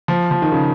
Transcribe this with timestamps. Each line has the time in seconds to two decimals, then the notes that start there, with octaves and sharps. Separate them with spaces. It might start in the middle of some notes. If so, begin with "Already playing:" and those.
0.08 F3
0.31 F3
0.42 D#3
0.52 C#3